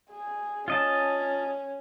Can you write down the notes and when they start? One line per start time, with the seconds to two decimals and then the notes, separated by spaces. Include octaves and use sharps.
0.11 G#4
0.68 C#4 F4 D#5 A5